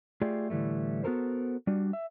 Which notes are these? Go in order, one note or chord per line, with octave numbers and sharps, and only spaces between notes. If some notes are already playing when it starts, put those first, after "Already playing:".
A3 F4 G4 G#4 D5
A2 D3 E3 G3 A3
B3 F#4 A4 A#4 C5
G3 D4 F#4
E5